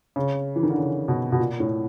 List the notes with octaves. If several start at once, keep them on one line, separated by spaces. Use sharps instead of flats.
C#3
E3
D#3
D3
C#3
B2
B2
A#2
A2